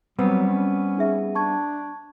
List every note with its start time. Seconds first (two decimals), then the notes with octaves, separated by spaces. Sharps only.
0.19 F#3 G3 B3 C4
0.47 C#4
0.97 D#4 G#4 E5
1.35 D4 A5 C#6 G#6